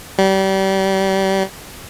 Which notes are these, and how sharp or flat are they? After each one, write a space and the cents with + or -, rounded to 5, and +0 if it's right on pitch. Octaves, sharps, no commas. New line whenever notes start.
G3 -30